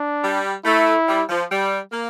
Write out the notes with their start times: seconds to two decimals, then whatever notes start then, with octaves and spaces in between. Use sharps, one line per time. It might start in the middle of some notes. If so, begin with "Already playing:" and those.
Already playing: D4
0.22 G3
0.64 A3 E4
1.07 G3
1.28 F3
1.49 G3
1.91 A#3